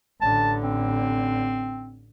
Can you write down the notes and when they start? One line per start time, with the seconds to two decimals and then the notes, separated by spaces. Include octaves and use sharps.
0.21 A1 D3 A5
0.63 C4